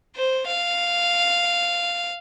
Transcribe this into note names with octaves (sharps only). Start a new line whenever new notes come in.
C5
F5